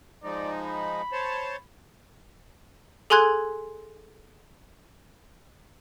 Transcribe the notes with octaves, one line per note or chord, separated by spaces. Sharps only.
F3 G#3 D#4 D5
B5
C5 C#5 A5
G#4 A4 G#5 C6 F#6 G#6